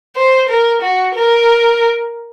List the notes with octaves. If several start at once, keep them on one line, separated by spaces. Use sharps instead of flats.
C5
A#4
F#4
A#4